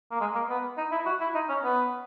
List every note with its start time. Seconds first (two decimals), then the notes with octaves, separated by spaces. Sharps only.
0.11 A#3
0.21 G#3
0.35 A#3
0.49 B3
0.78 D#4
0.92 E4
1.06 F#4
1.20 E4
1.35 D#4
1.49 C#4
1.63 B3